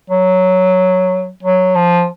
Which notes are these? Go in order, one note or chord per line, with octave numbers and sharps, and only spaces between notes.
F#3
F#3
F3